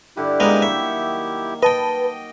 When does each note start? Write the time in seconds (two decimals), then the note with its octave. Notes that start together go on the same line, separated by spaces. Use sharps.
0.17 G2 D3 D4 E4 G4
0.40 G#3 A#3 B3 D#4 A#4
0.62 D#3 F#3 E5 C#6
1.63 B4 D#5 G5 A5